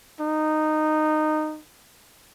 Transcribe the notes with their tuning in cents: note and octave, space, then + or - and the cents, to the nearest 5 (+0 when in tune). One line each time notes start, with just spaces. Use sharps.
D#4 -15